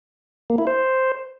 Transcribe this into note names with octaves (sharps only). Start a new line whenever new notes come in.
A#3
E4
C5